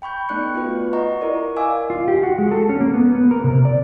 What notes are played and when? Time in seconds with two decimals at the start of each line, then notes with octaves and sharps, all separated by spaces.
0.02 G5 B5 C#6 G6
0.29 A3 B3 D#4 D5 F#6 C#7
0.54 B3 F4 F#4 B4
0.93 D#5 F#5 A#5 C6 C#6
1.21 E4 A#4 D5
1.56 D#5 F5 G#5 D6 E6
1.90 F4
2.08 G4
2.23 F#4
2.38 G#3
2.51 A4
2.69 C#4
2.81 A#3
2.94 B3
3.15 B3
3.31 A#4
3.44 C3
3.65 D5